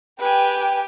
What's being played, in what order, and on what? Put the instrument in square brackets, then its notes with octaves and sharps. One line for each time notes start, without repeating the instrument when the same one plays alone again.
[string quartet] G4 G5 [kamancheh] B4 G#5